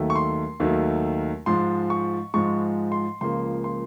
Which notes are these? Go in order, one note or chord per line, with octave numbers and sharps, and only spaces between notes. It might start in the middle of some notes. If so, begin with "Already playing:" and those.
Already playing: D#2 D#3 F#3 A3
C#6
C6
D#2 D#3 F#3 A3
G#2 F3 G#3 C6
C#6
G#2 F3 G#3 C#6
C6
C#2 C#3 F3 A#3 C6
C6